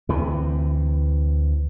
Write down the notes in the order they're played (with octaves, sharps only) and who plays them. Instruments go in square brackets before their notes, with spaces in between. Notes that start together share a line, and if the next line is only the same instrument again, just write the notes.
[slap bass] D2 C3 E3